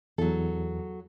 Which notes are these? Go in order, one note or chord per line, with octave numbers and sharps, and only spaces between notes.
E2 F#3 A4